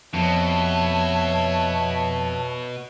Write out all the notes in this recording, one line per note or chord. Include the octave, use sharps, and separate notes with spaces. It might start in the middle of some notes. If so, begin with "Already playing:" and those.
F2 B2 C#5 E5 A5